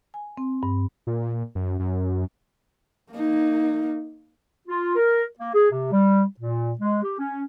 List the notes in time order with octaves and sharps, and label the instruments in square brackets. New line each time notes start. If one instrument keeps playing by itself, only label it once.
[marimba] G#5
C4
G2
[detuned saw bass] A#2
F#2
F#2
[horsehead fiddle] A#3 D#4
[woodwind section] F4
A#4
A#3
G#4
C3
G3
A#2
G#3
G4
C#4